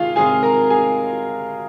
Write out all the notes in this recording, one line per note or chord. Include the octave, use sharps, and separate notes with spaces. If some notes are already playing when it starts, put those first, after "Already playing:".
Already playing: C3 D#3 G#3 C4 F4 G#4 F5
C3 D#3 G#3 C4 G#4 G#5
A#4 A#5
G#4 G#5